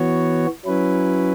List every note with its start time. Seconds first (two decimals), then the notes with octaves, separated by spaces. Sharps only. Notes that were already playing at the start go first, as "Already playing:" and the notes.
Already playing: E3 B3 F#4 C#5
0.65 F#3 C#4 E4 B4